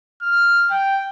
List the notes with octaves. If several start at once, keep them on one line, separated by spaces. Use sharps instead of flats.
F6
G5